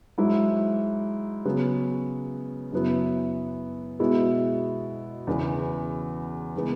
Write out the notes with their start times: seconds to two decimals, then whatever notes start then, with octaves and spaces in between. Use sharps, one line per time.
0.18 G#2 F#3 E4
1.45 C#3 F#3 B3
2.72 F#2 C#3 F#3 B3 E4
3.99 B2 G#3 B3 E4
5.27 E2 C#3 E3 B3
6.55 C#3 E3 G#3 B3